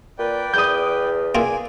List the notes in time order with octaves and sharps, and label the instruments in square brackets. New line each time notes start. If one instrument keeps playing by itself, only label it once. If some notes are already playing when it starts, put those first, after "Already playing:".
[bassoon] A#2 [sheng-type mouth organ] B4 D5 G5
[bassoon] E2 [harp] D#6 G6
[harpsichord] A#3 E4 F4 [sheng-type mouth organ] G#4 D5 G#5